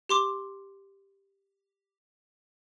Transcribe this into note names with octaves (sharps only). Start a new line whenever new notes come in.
G4 C6 D6